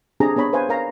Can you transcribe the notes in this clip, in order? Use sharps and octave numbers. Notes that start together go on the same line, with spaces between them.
C4 D4 G4 G#4 A#5
B3 D4 C#5 B5
B4 C5 F5 G#5
A#4 C#5 F5 A#5